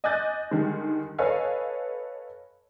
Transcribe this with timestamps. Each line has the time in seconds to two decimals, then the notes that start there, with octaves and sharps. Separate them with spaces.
0.04 D#5 G#5 D6 F#6 G6 A6
0.51 D3 D#3 G3 G#3
1.18 A4 B4 C#5 D#5 F5 G#5